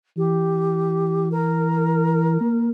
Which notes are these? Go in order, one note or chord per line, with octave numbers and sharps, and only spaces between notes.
E3 G4
A#4
A#3